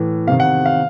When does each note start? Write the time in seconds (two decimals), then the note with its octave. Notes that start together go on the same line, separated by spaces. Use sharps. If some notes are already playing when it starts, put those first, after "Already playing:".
Already playing: A2 E3
0.27 C3 F5
0.32 D#3
0.40 F#5
0.66 F5